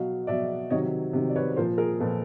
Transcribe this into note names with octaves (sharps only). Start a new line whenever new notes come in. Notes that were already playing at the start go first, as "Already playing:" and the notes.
Already playing: B2 F#3 D#5 F5
B2 F#3 D5 E5
C3 D#3 F#3 C#5 D#5
C3 D#3 F#3
D5
B4 C#5
B4
A#2 F3 A#4 C5
G#4 A#4
A#2 F3 A4 B4